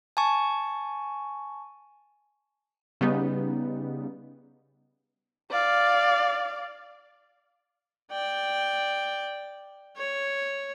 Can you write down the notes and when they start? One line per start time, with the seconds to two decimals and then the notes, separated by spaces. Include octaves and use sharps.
0.17 G#5 A5 C#6
3.01 C#3 G3 B3 D#4
5.52 D5 F5
8.12 D5 G5
9.97 C#5